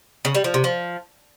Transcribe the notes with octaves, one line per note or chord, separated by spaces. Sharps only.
C#3
G3
F3
C3
F3